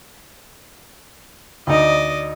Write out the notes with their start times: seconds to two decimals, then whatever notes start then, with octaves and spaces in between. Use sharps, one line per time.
1.67 D2 D#4 D5 D#5